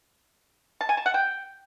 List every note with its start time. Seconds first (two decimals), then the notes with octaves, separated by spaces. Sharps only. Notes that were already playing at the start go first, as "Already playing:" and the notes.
0.81 A5
0.89 G#5
0.97 A5
1.06 F#5
1.14 G5